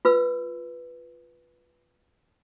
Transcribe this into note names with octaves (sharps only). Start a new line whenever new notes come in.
F4 B4 E6